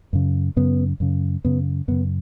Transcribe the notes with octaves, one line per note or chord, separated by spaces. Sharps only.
F#2 C#3
F#2 C#3 B3
F#2 C#3
F#2 C#3 B3
F#2 C#3 B3